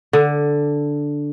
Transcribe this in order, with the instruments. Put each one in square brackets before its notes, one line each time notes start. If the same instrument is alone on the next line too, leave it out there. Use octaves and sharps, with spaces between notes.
[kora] D3